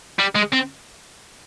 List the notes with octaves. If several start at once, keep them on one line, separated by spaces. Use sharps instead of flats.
G3
G#3
C4